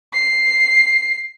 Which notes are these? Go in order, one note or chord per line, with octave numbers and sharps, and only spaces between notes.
C7